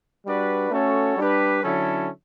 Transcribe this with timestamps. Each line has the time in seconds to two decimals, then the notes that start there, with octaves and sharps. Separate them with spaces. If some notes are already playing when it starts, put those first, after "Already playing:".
0.25 G3 D4 F#4 B4 D5
0.70 A3 C#4 F#4 A4 C#5
1.17 G3 D4 G4 B4
1.63 D3 F#3 C#4 E4 A4